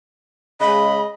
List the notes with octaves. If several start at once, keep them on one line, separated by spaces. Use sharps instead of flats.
C#3 G#3 D#5 B5